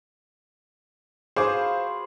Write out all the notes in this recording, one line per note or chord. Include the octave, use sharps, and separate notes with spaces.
F4 F#4 G#4 B4 C5 D6